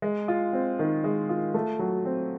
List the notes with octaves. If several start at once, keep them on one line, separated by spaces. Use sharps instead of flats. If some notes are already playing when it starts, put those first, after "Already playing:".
G#3
F4
C4
D#3
G#3
F4
A3
F#3
C4